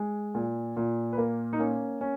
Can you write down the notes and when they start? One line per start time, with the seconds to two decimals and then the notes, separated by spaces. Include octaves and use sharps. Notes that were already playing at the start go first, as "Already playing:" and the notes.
Already playing: G#3
0.35 A#2
0.77 A#2
1.13 B4
1.18 A#3 A#4
1.53 D#4
1.59 A#3 C#4
2.01 C#4